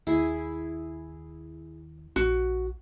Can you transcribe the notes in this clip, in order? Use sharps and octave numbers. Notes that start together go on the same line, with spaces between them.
D#2 E4 G#4
A#1 F#4